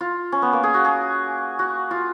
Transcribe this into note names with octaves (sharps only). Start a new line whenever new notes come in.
F4
C#4
B3
A#3
G#4
F#4
G#4
F#4
F4